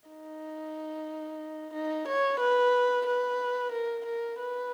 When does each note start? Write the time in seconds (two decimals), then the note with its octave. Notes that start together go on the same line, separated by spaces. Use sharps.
0.09 D#4
1.74 D#4
2.08 C#5
2.40 B4
3.07 B4
3.72 A#4
4.06 A#4
4.39 B4